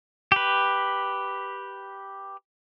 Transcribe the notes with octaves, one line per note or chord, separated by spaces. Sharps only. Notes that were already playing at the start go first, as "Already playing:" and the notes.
G4 B4